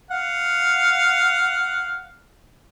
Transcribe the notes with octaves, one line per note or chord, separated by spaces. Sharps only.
F5 F#5